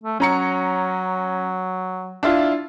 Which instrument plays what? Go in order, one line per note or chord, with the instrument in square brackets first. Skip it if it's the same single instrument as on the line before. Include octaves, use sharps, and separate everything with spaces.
[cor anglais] A3
[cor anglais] F#3 [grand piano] C#4 A#5 C#7
[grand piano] D4 E4 F4